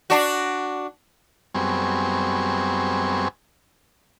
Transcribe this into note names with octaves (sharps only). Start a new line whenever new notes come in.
D4 F#4
F#2 G3 B3 C4 G#4 C#6